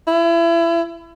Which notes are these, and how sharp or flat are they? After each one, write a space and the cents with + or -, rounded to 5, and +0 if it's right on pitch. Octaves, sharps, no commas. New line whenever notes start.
E4 +30